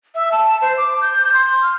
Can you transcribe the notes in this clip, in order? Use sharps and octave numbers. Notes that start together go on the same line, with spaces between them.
E5
A5
C5
D6
G6
C6
F6